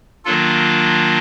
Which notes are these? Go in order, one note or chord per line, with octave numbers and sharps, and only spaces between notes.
D#3 F#3 A#3 D4 F4 A4